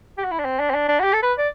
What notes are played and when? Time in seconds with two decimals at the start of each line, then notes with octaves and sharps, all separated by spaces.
0.18 G4
0.24 F#4
0.31 E4
0.39 D4
0.45 C4
0.60 D4
0.70 C4
0.75 D4
0.89 D4
1.00 F#4
1.03 G4
1.13 A4
1.23 B4
1.38 D5